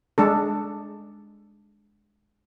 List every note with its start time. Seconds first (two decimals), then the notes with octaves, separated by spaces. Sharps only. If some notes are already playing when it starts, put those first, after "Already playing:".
0.18 G#3 D4 A4